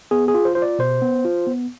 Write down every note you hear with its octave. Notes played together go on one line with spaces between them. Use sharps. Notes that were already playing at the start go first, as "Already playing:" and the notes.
B3 G#4
G#4
F4
C5
F4 C5
D5
B2 C5
B3
F4
B3